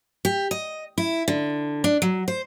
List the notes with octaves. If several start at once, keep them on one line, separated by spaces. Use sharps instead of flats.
G4
D#5
E4
D3
D4
F#3
C5